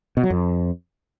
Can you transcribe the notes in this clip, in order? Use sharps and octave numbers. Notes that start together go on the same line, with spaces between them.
B2
F#3
F2